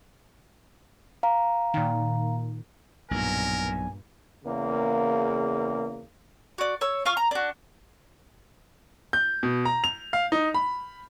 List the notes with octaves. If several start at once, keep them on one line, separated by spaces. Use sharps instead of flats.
F5 A#5
A#2 D#3
B1 G2 A#2 A#4 G#5
E2 C#3 A#3
F#4 D5
C#5 E6
F4 F5 C#6 F6
A#5
D4 F#4
G6
B2
A#5
F7
F5
D#4
B5